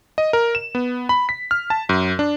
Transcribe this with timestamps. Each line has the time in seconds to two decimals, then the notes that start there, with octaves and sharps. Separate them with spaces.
0.18 D#5
0.33 A#4
0.55 E7
0.75 B3
1.09 B5
1.29 B6
1.51 F6
1.70 A5
1.89 F#2
2.19 D4